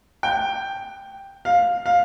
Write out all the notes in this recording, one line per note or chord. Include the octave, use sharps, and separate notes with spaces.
G5
F5
F5